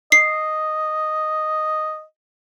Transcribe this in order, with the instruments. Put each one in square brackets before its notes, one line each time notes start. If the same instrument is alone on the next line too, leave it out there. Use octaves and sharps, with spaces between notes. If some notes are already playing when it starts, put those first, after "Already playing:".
[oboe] D#5 [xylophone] C7